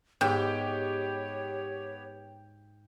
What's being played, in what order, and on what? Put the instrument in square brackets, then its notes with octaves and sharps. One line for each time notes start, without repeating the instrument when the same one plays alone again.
[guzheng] G#2 [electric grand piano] B3 G4 [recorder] C#5 [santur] G5